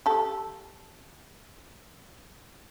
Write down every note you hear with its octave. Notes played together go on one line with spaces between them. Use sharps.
G4 A4